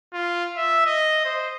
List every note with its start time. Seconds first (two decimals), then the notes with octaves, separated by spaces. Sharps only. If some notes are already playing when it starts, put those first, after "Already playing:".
0.13 F4
0.57 E5
0.86 D#5
1.25 C5